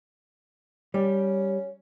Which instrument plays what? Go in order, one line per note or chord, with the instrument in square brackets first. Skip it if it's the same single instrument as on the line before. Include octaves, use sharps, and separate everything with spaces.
[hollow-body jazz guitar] G3 [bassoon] C#4